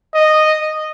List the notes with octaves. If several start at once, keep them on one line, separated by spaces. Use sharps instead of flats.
D#5